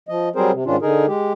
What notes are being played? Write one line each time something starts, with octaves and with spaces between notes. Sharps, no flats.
F3 D#5
F#3 G3 C4 G#4 A#4 C5
C3
G#2 D#3 C#4 D4 F4
D3 D#4 G#4 A#4
G#3 G4